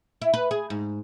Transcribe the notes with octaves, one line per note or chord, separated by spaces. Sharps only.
E4
B4
G#4
G#2